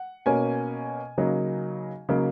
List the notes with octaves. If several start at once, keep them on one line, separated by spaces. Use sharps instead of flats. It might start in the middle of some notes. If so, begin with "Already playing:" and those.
Already playing: F#5
B2 A#3 C#4 G#5
C#3 F#3 A#3 D#4
C#3 F#3 A#3 D#4